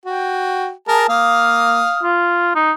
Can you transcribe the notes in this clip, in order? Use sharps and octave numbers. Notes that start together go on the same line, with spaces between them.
F#4 G5
G#4 A#4 A5
A#3 F5 D#6 F6
F4
D#4